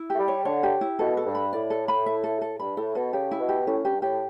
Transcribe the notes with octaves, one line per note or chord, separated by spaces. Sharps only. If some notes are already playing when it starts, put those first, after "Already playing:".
Already playing: E4
A3 G4
G3
C#5
D3 C#5
G4
E4
B2 A4
A4
G2
B5
A2 D5
A4
B5
E5
A4
A4
G2 B5
A2 A4
B2 A4
C#3 G4
E4
B2
G4
A2 C#4
G2 G4
A2 G4